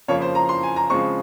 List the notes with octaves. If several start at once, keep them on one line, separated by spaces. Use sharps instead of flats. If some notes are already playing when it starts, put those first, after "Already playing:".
F2 C#3 F3 A#3 C#5
C5
A#5
C6
G#5
A#5
C#3 F3 G#3 C4 C#6